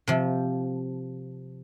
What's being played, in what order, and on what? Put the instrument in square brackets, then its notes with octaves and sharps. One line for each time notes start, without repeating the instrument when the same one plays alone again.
[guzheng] C3 F3